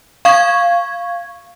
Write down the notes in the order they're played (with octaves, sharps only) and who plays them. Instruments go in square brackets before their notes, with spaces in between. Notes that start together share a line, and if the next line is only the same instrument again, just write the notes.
[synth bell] F5 C#6 G#6